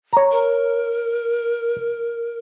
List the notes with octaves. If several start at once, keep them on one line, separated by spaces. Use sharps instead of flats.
C#5 A#5
A#4